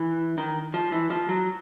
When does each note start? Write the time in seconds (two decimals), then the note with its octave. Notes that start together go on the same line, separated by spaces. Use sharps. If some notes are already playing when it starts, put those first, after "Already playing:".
Already playing: E3
0.38 D#3
0.74 F3
0.92 E3
1.10 F3
1.29 F#3